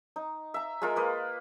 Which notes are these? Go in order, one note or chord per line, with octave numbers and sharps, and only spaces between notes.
D#4
E5 A#5
G#3 F4 A#4
A#3 B4 D#5